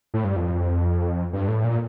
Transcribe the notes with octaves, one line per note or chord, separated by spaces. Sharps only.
A2
G2
F2
G2
A2
A#2